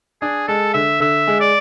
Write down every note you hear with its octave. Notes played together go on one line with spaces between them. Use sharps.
D4 G#4
G#3 A4
D3 E5
D3 E5
G#3
D5